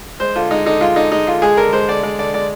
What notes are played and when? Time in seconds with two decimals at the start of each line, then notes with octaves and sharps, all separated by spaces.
0.20 G#3 C5
0.35 D3 F4
0.51 G#3 D#4
0.66 D3 D#4
0.81 G#3 F4
0.96 D3 D#4
1.12 G#3 D#4
1.27 D3 F4
1.42 G#3 G#4
1.57 D3 A#4
1.73 G#3 C5
1.88 D3 D5
2.03 G#3 D5
2.19 D3 D5
2.34 G#3 D5